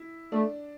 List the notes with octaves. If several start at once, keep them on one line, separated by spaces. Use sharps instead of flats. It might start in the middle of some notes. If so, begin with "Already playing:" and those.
Already playing: E4
A3 D4